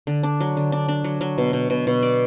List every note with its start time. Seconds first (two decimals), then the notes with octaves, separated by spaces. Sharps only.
0.07 D3
0.23 D4
0.40 F#3
0.57 D3
0.72 D4
0.88 D4
1.04 F#3
1.21 F#3
1.38 B2
1.53 B2
1.70 B2
1.87 B2
2.03 D5